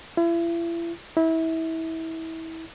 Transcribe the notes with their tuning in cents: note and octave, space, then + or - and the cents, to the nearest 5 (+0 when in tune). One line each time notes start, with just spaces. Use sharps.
E4 +40
E4 -25